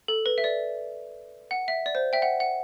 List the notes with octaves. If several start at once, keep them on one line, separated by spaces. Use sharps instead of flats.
A4
B4
E5
D5
F#5
E5
D5
C5
E5 G5
F#5
F#5